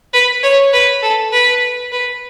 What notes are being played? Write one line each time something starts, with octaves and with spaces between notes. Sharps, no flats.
B4
C#5
B4
A4
B4
B4